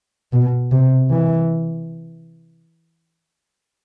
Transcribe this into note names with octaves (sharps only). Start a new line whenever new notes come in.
B2
C3
E3